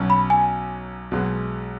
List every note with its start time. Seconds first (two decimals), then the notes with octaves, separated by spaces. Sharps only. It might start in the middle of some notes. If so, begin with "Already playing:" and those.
Already playing: B1 B2 F#3 C#4
0.10 B5
0.30 G#5
1.11 B1 B2 G#3 B3